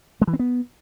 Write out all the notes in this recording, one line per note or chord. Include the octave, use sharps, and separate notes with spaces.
G#3
E3
C4
B3